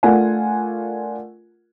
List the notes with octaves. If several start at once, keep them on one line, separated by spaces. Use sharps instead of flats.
A3 D4 F4 A#4 F#5 G#5